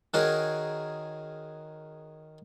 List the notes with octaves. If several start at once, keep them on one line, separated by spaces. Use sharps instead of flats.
D#3 F#4 G#4 A#4 C#5